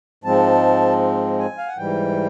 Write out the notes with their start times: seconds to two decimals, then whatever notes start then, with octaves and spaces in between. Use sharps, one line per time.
0.24 G#2 F3 G#3 C4 A5
1.39 G#5
1.58 F5
1.67 F#5
1.77 G#2 E3 G3 G5